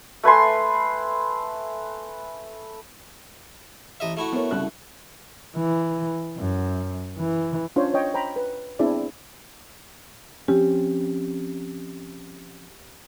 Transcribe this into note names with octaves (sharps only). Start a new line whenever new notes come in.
A3 B4 G#5 C6
A1 D#5 E5
A3 E4 F#4
B3 A#4 C#5
C2 C#3 F#6
E3
F#2
E3
C#4 D4 F4 C5 C#5
C#5 D#5 G5
C5 G5 A#5 B5
B4
B3 C4 D4 E4 G#4 D5
F3 C4 C#4 G4